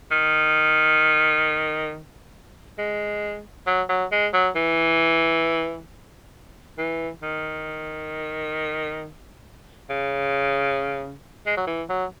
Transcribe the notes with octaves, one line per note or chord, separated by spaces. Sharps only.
D#3
G#3
F#3
F#3
G#3
F#3
E3
E3
D#3
C#3
G#3
F#3
E3
F#3